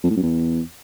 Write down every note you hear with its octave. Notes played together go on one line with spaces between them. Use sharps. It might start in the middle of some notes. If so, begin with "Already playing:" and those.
F2
A2
F#2
E2